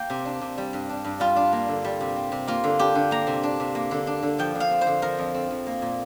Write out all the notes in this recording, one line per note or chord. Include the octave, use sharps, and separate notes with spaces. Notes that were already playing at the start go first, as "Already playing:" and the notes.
Already playing: A#3 G5
C3
D4
C3
G3
G2
D4
G2
G3 F4
D4
A#3
D3
G3
C3
C4
C3
A#3 F4
D3
D4 G4
D3
A#3 A#5
C3
D4
C3
A#3
D3
D4
D3
F3 G5
D3
F5
C4
C5
D3
F3 A#4
F2
C4
F2
A#3
A#2